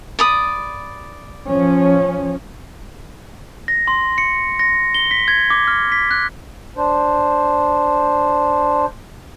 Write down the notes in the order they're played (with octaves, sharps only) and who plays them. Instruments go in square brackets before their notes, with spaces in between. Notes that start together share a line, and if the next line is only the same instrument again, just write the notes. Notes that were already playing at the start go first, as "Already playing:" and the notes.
[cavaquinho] D5 B5 D#6
[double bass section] F3 C#4
[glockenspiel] A#6
C6
C#7
A#6
G7
B6
G#6
D6
F6
B6
F#6
[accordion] D4 C5